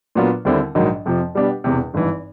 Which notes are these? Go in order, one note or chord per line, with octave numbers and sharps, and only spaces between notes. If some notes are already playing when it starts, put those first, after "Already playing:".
A#2 F#3 B3 D4 F4
D#2 D3 G3 C4 E4
A#1 G#2 D#3 F#3
F2 C3 F3
B2 G3 B3 D4 G4
E1 E2 C3
G#1 G2 E3